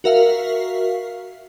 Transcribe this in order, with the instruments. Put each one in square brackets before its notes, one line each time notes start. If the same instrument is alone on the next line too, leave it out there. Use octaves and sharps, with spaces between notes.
[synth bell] F#4 A#4 E5 F5